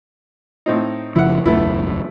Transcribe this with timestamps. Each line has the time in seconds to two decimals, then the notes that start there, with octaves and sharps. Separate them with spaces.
0.66 A2 C4 D#4
1.16 F#1 C#3 F3 E4 F#5
1.46 E1 C#2 F#2 A3 B3 E4